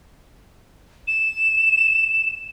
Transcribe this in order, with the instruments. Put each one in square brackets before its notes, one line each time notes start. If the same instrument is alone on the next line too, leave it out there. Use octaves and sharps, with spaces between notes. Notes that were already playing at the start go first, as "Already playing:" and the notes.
[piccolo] E7